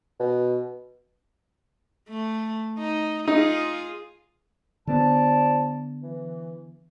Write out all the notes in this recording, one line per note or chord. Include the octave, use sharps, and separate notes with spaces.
B2
A3
D#4
D#4 F4 G#4
D3 F3 B3 D5 A5
E3